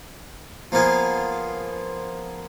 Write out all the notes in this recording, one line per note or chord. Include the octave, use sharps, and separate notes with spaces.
F3 A#3 B3 F4 G#4